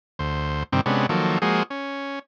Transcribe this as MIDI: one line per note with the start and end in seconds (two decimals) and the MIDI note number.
0.19 0.63 38
0.19 0.63 72
0.72 0.81 43
0.72 0.81 48
0.72 0.81 51
0.72 0.81 60
0.86 1.06 48
0.86 1.06 56
0.86 1.06 59
0.86 1.06 61
0.86 1.06 62
1.09 1.38 51
1.09 1.38 53
1.09 1.38 54
1.09 1.38 58
1.09 1.38 69
1.42 1.63 53
1.42 1.63 56
1.42 1.63 58
1.42 1.63 66
1.42 1.63 68
1.42 1.63 72
1.70 2.19 61